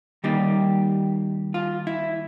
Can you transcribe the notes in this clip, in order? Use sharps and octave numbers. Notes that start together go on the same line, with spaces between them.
D#3 G3 A#3 D#4 G4
F4
E4